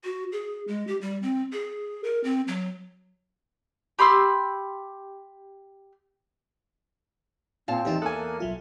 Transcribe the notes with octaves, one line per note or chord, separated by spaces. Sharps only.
F#4
G#4
G#3
G4
G3
C4
G#4
A#4
C4
F#3
G4 B5 C6 E6
A#2 C4 F5 A5
E2 E3 D#4 G4 E5 A5
A#3 A4 G#5 D#6 F#6
B1 F#3 F4 E5